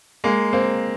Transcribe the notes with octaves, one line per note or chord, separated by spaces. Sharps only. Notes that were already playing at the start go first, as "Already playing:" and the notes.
G#3 A#3
A#3 C4